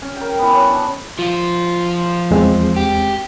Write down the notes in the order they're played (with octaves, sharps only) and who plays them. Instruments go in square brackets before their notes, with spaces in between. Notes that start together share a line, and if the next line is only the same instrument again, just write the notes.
[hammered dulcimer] C#4
A#4 G5
E3 B3
F#4 C#5
D4
[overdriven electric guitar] F3 F4
[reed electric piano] E2 G#3 C4
[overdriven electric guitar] G4